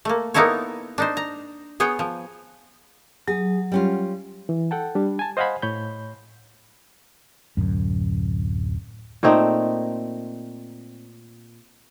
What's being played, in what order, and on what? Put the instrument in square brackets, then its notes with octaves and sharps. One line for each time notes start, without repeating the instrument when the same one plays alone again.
[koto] A3 A#3
A#3 B3 D#4 E4 A4 C#5
D4 D#4 C5
A#5
B3 G#4 C#5 G5
F3
[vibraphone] F#3 [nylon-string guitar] G#4
[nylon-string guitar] G3 C#4 F4
[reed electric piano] E3
A4 F#5 G5 A5
G3 D4
G#5 A5
C5 D#5 F5 F#5 G#5 B5
A2 C#5 B5 G6
[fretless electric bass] D1 F#2
[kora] A#2 A3 C4 D#4